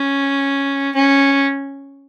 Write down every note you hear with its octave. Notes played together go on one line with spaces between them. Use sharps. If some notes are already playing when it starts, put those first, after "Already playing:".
Already playing: C#4
C#4